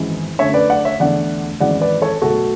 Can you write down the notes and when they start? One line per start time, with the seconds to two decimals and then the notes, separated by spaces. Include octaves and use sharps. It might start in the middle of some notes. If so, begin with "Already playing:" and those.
Already playing: G#1 F#2 E3 G#3
0.39 F#2 D3 A3 C#5 E5
0.54 B4 D5
0.70 D5 F#5
0.85 C#5 E5
1.00 E2 D3 A3 D5 F#5
1.60 G#1 F#2 E3 G#3 D5 F#5
1.81 B4 D5
2.02 A4 C#5
2.22 B1 B2 A3 F#4 A4